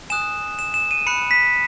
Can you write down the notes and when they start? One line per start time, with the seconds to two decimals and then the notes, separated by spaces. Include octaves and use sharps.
0.10 G#5 D#6 F#6 E7
0.59 E7
0.74 E7
0.91 D#7
1.06 B5 F#6 C#7
1.31 B6